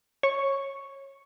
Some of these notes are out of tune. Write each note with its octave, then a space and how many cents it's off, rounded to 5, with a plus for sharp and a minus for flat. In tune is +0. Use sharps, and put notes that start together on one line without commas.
C#5 -20 C#6 +0